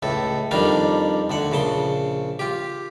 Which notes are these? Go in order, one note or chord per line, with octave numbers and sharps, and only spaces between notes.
C#2 A2 A4
F2 D#3 G3 D4 D#4 F5
D2 D3 F#5
A#1 C#3 A5 C6
F4 G4